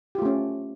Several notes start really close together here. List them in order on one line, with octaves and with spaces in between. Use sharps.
G4 F4 A3 C#4